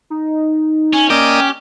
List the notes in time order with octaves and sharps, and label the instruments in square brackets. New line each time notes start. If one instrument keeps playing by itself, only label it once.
[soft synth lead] D#4
[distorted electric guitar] C#4 [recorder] G#5
[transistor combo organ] A#3 D5 D#5 [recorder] C#4 [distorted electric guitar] G4 [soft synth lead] G5